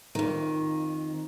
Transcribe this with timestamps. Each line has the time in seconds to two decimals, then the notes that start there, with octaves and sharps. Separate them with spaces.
0.15 F2 D#3